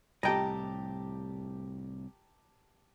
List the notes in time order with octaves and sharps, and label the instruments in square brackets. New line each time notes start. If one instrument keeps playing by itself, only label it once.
[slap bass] C2 A2 [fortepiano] G4 A5 A#5 [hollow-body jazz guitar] D#5 G5